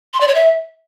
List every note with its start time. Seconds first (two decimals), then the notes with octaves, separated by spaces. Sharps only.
0.14 C6
0.21 D5
0.28 C#5
0.35 E5